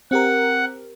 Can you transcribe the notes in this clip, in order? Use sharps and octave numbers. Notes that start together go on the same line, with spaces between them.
C4 G4 A#4 F#5